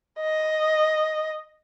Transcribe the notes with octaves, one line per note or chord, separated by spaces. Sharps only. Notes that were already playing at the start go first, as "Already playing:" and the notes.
D#5